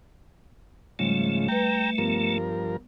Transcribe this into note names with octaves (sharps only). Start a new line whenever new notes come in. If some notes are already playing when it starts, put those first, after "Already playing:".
G#2 C#3 F3 G3 A3
G3 B4 G5 A#5
G2 F3 B3 A#4